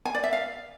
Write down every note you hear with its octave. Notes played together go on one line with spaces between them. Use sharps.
G#5
D5
E5
F5